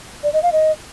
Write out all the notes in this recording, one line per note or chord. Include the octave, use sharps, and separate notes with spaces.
D5
D#5
F5
D#5